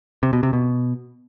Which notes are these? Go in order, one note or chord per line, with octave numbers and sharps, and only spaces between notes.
C3
B2
C3
B2